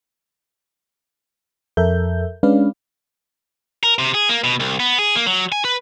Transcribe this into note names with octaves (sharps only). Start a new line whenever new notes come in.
F2 A4 A#4 E5 G6
G#3 C#4 D4 B4 D5 F5
A#4
C3
G#4
A#3
B2
C2
B3
G#4
A#3
F#3
G#5
B4